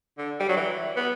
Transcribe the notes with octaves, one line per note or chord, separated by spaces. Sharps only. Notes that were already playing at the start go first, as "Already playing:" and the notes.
D3
G3
F#3
E3
B3